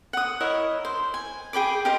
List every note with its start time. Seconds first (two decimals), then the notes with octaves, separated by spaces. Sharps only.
0.13 F#5 D#6
0.40 E4 A#4 C#5 D#5
0.85 C5
1.14 G#5
1.53 G#4 G5 B5 D6
1.85 G4 A#4 C5 D#5